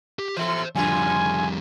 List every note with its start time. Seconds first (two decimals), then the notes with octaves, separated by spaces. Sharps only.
0.19 G4
0.36 E3 A4 C5 E5
0.75 F2 A2 C#3 G3 F4 G#5